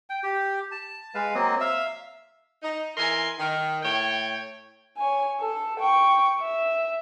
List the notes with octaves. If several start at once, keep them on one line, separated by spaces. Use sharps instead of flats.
G5
G4
A5
G#3 B4 F5
F#3 A#3 C4 D#5
E5 F5 E6
D#4
E3 A#4 G#5 C6
D#3
A2 C#5 G5
C#5 G#5
A4
G5 C#6
E5